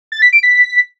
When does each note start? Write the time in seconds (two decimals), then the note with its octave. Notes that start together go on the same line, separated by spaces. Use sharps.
0.12 A6
0.22 B6
0.33 D7
0.43 B6